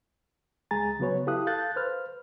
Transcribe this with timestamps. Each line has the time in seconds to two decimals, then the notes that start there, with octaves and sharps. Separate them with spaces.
0.71 C#2 G#3 G#4 G#5 A#5 A6
0.99 C#3 F#3 B3 F#4 B4 C#5
1.27 E4 G4 A4 F5 D#6 F#6
1.47 A4 F5 F#6 G6 A6
1.76 B4 C5 F6